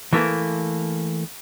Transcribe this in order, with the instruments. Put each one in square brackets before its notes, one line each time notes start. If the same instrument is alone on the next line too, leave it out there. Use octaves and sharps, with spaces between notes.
[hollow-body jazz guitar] E3 A3 A#3